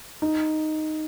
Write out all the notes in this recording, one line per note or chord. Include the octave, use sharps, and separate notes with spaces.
D#4